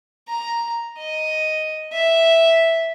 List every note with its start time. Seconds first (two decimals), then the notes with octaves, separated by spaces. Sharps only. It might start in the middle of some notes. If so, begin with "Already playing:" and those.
0.28 A#5
0.98 D#5
1.93 E5